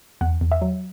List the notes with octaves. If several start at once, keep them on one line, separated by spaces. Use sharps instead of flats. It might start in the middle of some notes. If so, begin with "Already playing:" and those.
E2 F#5
E2
E5
F#3